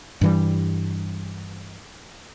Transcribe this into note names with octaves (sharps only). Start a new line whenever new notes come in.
G2 E3 G3